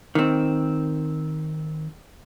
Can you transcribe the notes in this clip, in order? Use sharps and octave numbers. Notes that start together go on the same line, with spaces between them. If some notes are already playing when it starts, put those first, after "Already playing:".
D#3 C4